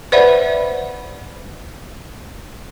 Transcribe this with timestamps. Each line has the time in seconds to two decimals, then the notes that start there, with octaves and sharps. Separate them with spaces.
0.12 B4 C5 D5 E5 F#5 B5